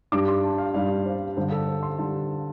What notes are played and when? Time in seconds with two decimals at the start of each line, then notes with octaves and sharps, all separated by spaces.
0.12 G2 G3 D4 D6
0.28 C6
0.44 A5
0.58 F5
0.74 G2 G3 D4 F5
1.06 C5
1.37 G2 D3 G3 C5
1.52 A4
1.67 C5
1.83 C6
1.99 D3 G3 A5